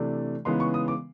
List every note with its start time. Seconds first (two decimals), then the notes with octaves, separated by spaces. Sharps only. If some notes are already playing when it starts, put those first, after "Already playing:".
Already playing: C3 E3 A3 D4
0.45 C#3 E3 G#3 B3 D#4 C6
0.60 C#6
0.74 D#6
0.88 D6